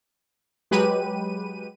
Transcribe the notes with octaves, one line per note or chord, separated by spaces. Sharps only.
F#3 G#3 G4 B4 D#7